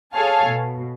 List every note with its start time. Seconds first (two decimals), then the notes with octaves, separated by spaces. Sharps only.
0.14 G#4 A4 C#5 F5 G#5 A5
0.48 B2